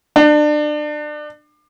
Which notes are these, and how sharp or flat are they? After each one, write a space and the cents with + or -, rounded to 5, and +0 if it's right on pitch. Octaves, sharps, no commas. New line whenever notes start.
D4 +30